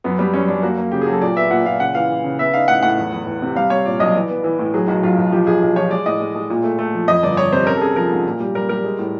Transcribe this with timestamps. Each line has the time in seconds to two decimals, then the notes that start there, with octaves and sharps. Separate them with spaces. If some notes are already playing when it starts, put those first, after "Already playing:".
0.04 F#2 B3
0.19 G3 B3
0.34 F#2 C#4
0.48 F#2 D4
0.63 A#3 F#4
0.78 A#3
0.92 C#3 G4
1.01 F#3 G#4
1.12 A4
1.22 A#2 D5
1.36 B3 E5
1.51 A#2 F#5
1.66 A#2 F5
1.80 C#3 F#5
1.95 E3 F5
2.09 E3
2.24 C#3
2.39 B3 E5
2.54 D#4 F5
2.68 A2 F#5
2.83 A2 F#5
2.98 E2
3.12 E2
3.26 E2
3.42 C3
3.56 G3 F5
3.70 G3 C#5
3.86 A#2 D5
4.00 B1 D#5
4.15 E3 D5
4.30 B3
4.44 E3
4.59 A2
4.74 F#3 G#4
4.88 B1 F#4
5.03 B1 F4
5.17 B1
5.32 F3 G4
5.47 B1 G#4
5.62 B1
5.76 F3 C#5
5.90 G#3 D5
6.06 A2 D#5
6.20 G#3
6.36 G#3
6.50 A#2
6.64 A3
6.79 A3
6.94 F3
7.08 F2 D#5
7.23 G1 D5
7.37 G1 C#5
7.53 C3 C5
7.66 C#4 A#4
7.77 A4
7.81 C#4 G#4
7.96 F3 A#4
8.11 G#2
8.26 A#2
8.40 G3
8.55 G3 A#4
8.69 G3 A#4
8.84 G#3
8.99 A2